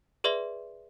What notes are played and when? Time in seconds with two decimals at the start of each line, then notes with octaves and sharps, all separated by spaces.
0.24 G#4 B4 D5 E5 C6 G7